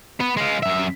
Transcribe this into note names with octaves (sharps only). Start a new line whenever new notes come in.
B3
G#3 F4
F#2 E5